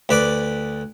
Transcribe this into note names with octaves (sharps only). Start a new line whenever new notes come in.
D2 B4 D5 D6